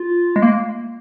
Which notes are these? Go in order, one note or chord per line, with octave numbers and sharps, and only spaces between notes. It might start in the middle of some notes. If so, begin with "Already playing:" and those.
Already playing: F4
G#3
A#3